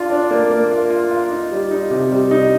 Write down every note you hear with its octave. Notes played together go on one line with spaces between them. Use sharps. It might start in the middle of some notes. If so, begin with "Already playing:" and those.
Already playing: D4 F4
D4
A#3
A#3
F4
F4
F4
D#4
G3
D#4
C3
G3
D#4